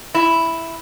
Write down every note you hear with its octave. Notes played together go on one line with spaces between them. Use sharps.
E4